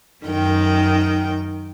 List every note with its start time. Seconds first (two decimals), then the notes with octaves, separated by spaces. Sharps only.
0.25 F#2 D#3 G5